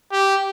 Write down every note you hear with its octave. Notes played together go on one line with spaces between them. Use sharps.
G4